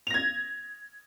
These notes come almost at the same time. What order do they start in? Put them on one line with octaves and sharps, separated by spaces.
F7 A#6 G#6